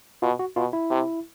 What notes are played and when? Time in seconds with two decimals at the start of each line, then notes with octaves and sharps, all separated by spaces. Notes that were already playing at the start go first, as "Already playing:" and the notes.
0.22 B2 F4
0.39 F#4
0.56 B2 F4
0.73 E4
0.90 C3